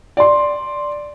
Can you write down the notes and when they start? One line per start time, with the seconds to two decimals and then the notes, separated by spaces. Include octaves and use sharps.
0.17 D5 C6